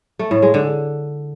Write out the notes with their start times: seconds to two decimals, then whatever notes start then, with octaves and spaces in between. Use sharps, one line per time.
0.19 A3
0.31 A2
0.42 G#3
0.54 D3